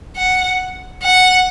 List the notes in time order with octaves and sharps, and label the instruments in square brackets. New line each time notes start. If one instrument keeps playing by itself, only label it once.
[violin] F#5
F#5